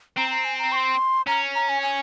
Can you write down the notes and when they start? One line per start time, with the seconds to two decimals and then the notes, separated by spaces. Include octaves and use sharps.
0.17 C4 A#5
0.31 A#5
0.45 G#5
0.59 A#5
0.72 C#6
0.76 C6
1.27 C#4 A#5
1.55 A#5
1.69 G#5
1.83 G#5